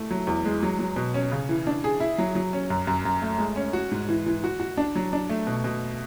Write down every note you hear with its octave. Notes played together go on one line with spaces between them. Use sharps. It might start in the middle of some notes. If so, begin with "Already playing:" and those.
Already playing: A3 E4
F#3
E2
G#3
F#3
F#3
B2
C#4
C#3
E3
D4
G#4
E4
F#3
F#3
C#4
F#2
F#2
F#2
A3
G#3
C#4
F#4
G#2
E3
E3
F#4
F#4
D4
F#3
D4
A3
B2
B2